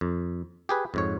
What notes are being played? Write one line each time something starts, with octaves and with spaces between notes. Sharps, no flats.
F2
G4 G#4 B4
F2 G#2 C#5